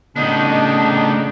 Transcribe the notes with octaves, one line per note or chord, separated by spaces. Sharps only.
A2 C#3 B3 D4 D#4 A5